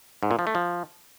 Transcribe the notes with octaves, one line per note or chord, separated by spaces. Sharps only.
G#2
A#2
F3
A3
F3